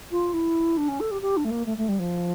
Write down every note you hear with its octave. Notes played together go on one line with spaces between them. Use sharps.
F4
E4
D4
C#4
A4
G4
G4
D4
A3
A#3
A3
A3
G3
F3